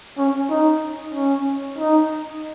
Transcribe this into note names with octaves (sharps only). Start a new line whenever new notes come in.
C#4
D#4
C#4
D#4